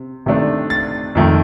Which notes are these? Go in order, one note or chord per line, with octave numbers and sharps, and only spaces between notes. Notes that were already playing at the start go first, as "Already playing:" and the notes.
Already playing: C3
C3 D#3 A3 D4
A6
F2 D#3 A3